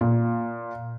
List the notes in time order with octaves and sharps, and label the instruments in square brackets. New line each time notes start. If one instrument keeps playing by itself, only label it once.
[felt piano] A#2